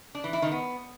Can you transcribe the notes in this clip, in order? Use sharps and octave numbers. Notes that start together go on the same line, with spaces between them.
D4
E3
E4
D#3
B3